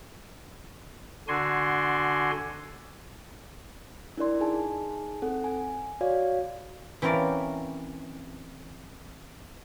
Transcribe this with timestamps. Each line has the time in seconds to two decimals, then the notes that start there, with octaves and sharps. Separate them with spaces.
1.28 D3 D4 F#4 G#5 C6
4.17 D4 E4 A#4 D5 C6
4.40 D#4 G#4 G#5 A5
5.22 C4 A4 F#5
5.44 G#5
6.01 F#4 C#5 D5 F5
7.02 E3 C4 C#4 A#4 D5 F5